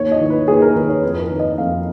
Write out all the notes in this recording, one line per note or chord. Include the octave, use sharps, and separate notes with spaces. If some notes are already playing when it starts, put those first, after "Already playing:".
Already playing: D#2 C#5
D#5
D#3
B4
D#2 G#4
A#4
D#3 B4
C#5
F2 B4
B4
A#4
D#3
D#5
F2 F5